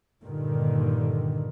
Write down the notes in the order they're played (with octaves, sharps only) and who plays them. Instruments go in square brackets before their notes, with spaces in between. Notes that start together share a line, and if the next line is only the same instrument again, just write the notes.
[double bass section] G2 A#2 D3 D#3